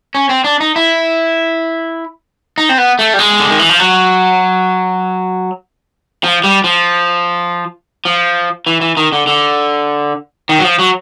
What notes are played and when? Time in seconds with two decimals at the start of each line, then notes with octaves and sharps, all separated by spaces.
0.15 C#4
0.29 C4
0.44 D4
0.61 D#4
0.76 E4
2.58 D#4
2.69 C4
2.78 B3
2.99 A3
3.14 G3
3.19 G#3
3.40 D3
3.50 D#3
3.59 E3
3.69 F3
3.79 F#3
6.24 F3
6.44 G3
6.64 F3
8.05 F3
8.66 E3
8.81 E3
8.97 D#3
9.12 D3
9.27 D3
10.49 D#3
10.59 F#3
10.64 F3
10.79 F#3